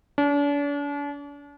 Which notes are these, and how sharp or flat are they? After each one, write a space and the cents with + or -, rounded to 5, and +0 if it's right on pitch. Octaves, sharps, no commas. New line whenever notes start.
D4 -40